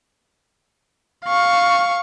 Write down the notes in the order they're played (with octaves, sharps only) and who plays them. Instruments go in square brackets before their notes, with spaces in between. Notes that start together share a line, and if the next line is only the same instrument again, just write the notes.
[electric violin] F5 C#6